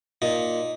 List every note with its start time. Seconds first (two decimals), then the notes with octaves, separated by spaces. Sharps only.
0.22 A#2 D#4